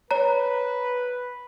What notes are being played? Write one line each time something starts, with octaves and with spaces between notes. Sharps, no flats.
B4 C#5 A#5